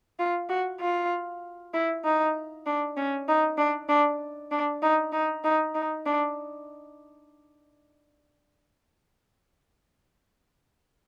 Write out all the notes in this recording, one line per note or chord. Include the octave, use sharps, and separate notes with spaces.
F4
F#4
F4
E4
D#4
D4
C#4
D#4
D4
D4
D4
D#4
D#4
D#4
D#4
D4